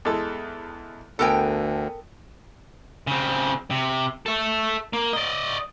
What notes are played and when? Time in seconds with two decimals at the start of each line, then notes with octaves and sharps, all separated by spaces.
0.05 E2 G#3 A4
1.19 D2 B3 A4 A#4 G5 G#5
3.07 C#3 C4
3.70 C3
4.26 A4 E5
4.93 A#3
5.13 D5 D#5